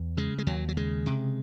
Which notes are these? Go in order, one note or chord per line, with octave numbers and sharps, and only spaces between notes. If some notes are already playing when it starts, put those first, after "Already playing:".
Already playing: E2
C#3 G#3
G#3
D#2 F#3
F#3
C#3 G#3
C3